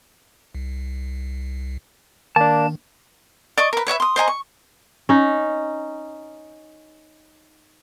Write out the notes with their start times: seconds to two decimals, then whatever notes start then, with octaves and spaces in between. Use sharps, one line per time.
0.55 C2
2.36 D#3 A#3 D4 A5
3.58 D5 D#5 C#6
3.73 A#4 B4
3.87 B4 C#5 D#5 E5
4.00 C6 D#6
4.16 C5 D#5 G#5 A#5
4.28 C#6
5.09 C#4 D#4